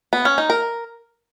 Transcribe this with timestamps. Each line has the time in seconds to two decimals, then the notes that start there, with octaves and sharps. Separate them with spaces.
0.13 B3
0.25 C#4
0.38 D#4
0.50 A#4